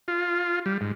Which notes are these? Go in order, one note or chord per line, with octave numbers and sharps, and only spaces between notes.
F4
G3
G#2